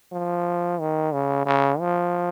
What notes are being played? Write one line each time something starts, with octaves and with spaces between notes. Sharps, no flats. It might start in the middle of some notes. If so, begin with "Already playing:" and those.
F3
D#3
C#3
C#3
F3